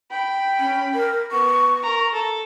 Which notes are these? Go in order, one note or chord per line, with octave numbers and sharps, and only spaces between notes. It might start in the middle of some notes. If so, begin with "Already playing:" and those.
G5 B5
C#4
A#4
B3 C#6
A#4 A#5
A4